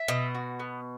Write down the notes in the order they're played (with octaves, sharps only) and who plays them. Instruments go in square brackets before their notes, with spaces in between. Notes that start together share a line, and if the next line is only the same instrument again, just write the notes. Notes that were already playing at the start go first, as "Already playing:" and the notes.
Already playing: [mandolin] E5
[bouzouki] B2 [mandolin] D#5
[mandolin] F#4
B3